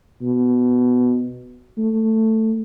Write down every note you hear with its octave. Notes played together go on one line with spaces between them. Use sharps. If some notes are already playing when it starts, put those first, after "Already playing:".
B2
A3